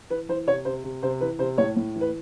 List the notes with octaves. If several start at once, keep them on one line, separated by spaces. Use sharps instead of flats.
E3 B4
E3 C5
C3 C#5
C3 C5
C3
C3 C5
E3 B4
C3 C5
A2 C#5
A2
E3
B4